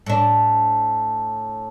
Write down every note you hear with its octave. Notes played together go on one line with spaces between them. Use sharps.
A2 D4